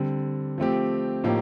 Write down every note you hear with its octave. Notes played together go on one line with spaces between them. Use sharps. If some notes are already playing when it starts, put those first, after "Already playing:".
Already playing: D3 G3 C4
F3 A3 C4 G4
A2 F3 A#3 D#4 G4